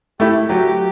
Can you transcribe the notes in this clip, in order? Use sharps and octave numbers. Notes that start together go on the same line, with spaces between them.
A3 E4 G4
F#3 G4